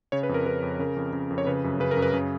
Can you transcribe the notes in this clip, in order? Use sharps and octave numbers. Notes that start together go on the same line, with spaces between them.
C#3 C#5
B4
F2
A#4
C#3 B4
F2
C#3 A#4
F2
C#3
F2
C#5
C#3 B4
F#2
C#3 B4
A#4
F#2
B4
C#3